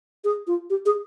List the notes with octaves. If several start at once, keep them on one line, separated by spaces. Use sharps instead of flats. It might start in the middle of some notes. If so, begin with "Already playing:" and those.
G#4
F4
G4
G#4